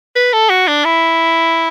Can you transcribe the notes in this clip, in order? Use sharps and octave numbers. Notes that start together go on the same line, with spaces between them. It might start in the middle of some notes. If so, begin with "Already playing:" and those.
B4
A4
F#4
D4
E4